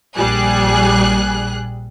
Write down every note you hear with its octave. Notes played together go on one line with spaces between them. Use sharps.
A#1 G3 G#4 F#6